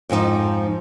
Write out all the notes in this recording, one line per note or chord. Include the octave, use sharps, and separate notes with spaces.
F2 G#2 F3 D#4